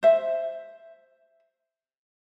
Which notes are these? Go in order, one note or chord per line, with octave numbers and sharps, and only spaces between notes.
C5 E5